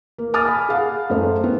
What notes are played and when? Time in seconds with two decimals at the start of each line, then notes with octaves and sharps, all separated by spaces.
0.18 A#3
0.34 G#5 D6 D#6 F6 A6
0.45 G#5 B5
0.68 G#4 F5 F#5
1.10 F#2 A3 C5
1.44 B3 C4